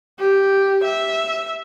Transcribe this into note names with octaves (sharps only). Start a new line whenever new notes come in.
G4
E5